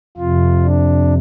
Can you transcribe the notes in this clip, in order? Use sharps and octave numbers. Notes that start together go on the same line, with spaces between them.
F2 C3 F4
D4